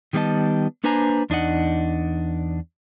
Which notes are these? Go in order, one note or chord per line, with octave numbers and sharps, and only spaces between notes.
D#3 G3 B3 G#4 D#5 A5
A#3 D4 B4 C5 G#5 A#5
E2 D4 D#4 D#5 F#5